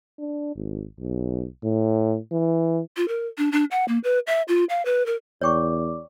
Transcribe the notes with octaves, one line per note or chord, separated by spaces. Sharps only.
D4
G#1
B1
A2
E3
F4
A#4
D4
D4
F#5
A#3
B4
E5
F4
F5
B4
A#4
E2 C#5 D5 G5 C#6 D6